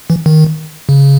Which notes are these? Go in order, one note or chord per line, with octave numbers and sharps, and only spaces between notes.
E3
D#3
C#3